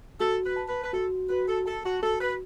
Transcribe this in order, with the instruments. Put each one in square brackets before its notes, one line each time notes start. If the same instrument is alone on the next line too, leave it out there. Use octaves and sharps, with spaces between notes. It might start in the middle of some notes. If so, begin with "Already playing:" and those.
[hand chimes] F#4 [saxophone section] A4
[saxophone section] B4
[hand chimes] A5
[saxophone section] B4
B4
[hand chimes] F#4 [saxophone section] A4
[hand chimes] F#4 [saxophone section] B4
[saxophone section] A4
[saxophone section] A4 [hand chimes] A5
[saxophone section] F#4
[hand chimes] F#4 [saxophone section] A4
[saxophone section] B4